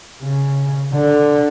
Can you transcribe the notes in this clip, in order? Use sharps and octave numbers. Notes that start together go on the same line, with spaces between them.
C#3
D3